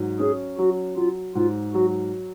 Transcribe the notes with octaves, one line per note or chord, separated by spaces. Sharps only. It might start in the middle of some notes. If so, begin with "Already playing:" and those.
Already playing: G#2 F#3
C#4 G#4
F#3 F#4
F#3 F4
G#2 F4
F#3 F#4